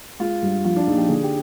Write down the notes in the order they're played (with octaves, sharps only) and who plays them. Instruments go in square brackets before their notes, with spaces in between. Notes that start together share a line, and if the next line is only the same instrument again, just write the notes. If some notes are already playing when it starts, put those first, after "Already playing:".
[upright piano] G#3 [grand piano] F4
[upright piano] G2
[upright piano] F3 [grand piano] F4
[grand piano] D4
[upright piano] A#1 [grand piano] D#4
[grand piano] G4
[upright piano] D3 [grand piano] G#4
[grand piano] G4